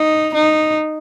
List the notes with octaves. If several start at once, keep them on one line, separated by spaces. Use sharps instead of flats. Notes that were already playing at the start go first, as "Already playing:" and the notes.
Already playing: D#4
D#4